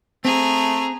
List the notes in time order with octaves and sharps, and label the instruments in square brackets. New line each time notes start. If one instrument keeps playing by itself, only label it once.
[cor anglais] A3 [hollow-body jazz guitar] C4 [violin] G#4 A#5